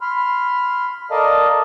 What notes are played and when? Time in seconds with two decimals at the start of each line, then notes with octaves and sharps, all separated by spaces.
0.01 B5 C6 F6
1.11 A4 A#4 D5 D#5 F5 A5